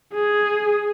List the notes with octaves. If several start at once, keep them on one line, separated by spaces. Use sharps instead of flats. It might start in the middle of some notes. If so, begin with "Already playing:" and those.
G#4